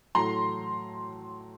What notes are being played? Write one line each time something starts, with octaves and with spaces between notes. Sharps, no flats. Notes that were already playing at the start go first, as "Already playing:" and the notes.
A2 F#3 A3 A#5 C6